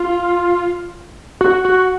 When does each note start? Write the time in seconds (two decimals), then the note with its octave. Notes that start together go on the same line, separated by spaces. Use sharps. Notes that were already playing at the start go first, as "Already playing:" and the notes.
Already playing: F4
1.41 F#4
1.65 F#4